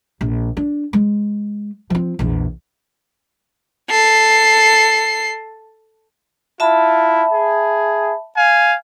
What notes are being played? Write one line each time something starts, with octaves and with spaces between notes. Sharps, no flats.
A#1
D4
G#3
F3 C4
A#1 E2
A4 C7
E4 F4 E5 A5 B5
G#4
F5 G#5